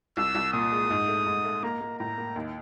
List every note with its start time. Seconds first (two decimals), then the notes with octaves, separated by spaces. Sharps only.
0.17 C2 E6
0.35 C2
0.53 A#2 D#6
0.72 G#3
0.90 G#2
1.08 A3
1.26 G#2
1.44 A3
1.63 A#3 A#5
1.81 A#3
1.99 A2 A#5
2.18 A#3
2.36 D#2